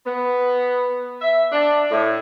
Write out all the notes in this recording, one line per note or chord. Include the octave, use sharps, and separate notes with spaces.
B3
E5
D4
A2